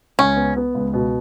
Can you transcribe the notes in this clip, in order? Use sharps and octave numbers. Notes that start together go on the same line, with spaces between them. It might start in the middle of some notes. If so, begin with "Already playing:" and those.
C#2 C#4
B3
B3
C#2
B2